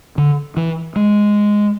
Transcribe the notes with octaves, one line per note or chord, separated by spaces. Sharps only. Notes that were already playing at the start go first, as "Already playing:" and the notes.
D3
E3
G#3